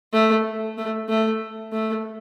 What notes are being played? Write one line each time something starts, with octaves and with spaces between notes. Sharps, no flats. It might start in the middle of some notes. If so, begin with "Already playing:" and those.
A3
A3
A3
A3